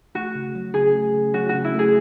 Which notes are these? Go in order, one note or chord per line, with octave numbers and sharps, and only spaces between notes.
A3 F#4
C#3
F#3
C#3 G#4
A3
C#3
F#3 F#4
C#3 F#4
E4
A3 G#4